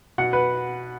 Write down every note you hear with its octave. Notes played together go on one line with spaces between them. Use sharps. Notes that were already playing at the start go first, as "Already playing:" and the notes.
B2 F#5
B4